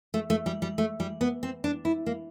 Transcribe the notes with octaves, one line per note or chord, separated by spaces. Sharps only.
A3
A3
G3
G3
A3
G3
B3
C4
D4
E4
A#3